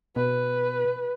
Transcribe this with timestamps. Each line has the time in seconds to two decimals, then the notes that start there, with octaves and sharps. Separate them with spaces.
0.16 B2 B4